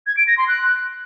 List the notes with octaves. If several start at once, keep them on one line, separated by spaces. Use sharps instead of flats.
G#6
D7
A#6
C6
F#6